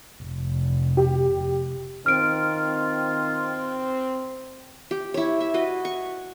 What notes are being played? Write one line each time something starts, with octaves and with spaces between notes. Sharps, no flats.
F1
G4
D#3 C4 F4 F6 D7
G4
E4 C#5
E5
F#4 B4 D#5
C#6